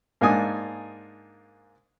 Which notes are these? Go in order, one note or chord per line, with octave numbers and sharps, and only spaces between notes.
G#2 A#3 D4 D#4 G#5 D#6